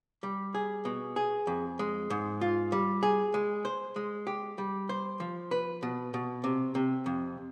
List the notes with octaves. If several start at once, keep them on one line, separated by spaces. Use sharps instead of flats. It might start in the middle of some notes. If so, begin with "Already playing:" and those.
G3
G#4
B2
G#4
F2
G#3
G#2
F4
G3
G#4
G#3
C5
G#3
G4
G3
C5
F3
B4
B2
B2
C3
C3
F2